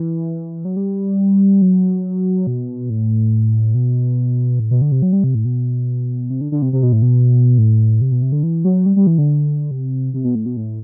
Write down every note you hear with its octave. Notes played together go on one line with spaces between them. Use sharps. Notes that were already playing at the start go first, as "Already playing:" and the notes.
Already playing: E3
F#3
G3
F#3
B2
A2
B2
A2
B2
D3
C3
F#3
G3
C3
A2
B2
C3
D3
D3
C3
C3
B2
A2
B2
A2
C3
B2
C3
D3
E3
F#3
G3
G3
E3
D3
C3
C3
B2
A2
B2
A2